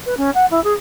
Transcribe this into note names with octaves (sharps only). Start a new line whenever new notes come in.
B4
C#4
F#5
E4
G#4